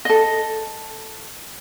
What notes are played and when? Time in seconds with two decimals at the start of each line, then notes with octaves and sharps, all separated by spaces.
0.05 A4 D#5